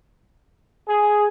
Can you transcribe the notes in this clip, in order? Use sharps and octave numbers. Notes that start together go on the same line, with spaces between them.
G#4